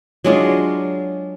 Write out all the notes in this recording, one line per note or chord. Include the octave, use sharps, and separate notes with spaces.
F#3 G#3 D4 F4